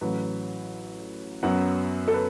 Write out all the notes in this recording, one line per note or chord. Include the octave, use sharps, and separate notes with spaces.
A1 A2 F#3 B4
F#2 F#3 B3 F#5
A4
B4